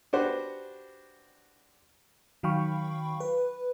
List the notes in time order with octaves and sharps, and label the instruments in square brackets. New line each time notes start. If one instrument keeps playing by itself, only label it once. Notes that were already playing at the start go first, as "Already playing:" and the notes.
[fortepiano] D4 F#4 G4 B4 C5 F#5
[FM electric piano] D#3 F#3 F5 G5 B5 C#6
B4